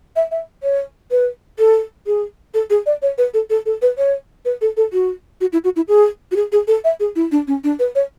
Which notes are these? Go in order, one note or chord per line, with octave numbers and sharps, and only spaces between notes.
E5
E5
C#5
B4
A4
G#4
A4
G#4
D5
C#5
B4
A4
A4
A4
B4
C#5
B4
A4
A4
F#4
F#4
E4
F#4
E4
G#4
F#4
G#4
G#4
A4
E5
G#4
E4
D4
C#4
D4
B4
C#5